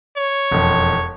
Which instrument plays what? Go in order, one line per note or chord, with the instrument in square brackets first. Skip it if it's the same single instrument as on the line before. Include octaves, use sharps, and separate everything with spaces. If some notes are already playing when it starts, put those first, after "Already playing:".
[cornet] C#5
[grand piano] E1 F2